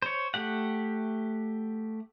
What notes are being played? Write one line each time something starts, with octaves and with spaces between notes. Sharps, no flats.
C5 C#5
A3 G4 F#5